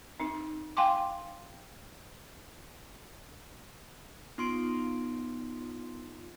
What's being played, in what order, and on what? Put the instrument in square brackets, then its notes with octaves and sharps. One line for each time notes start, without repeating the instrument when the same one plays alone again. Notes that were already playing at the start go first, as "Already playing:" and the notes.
[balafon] C4 D#4
F5 G5 G#5 C6 D6
[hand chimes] B3 C6 D7 [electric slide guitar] D#4 F4